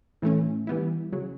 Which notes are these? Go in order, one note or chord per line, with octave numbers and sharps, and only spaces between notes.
A2 E3 A3 C#4
E3 G3 B3 E4
C#3 F#3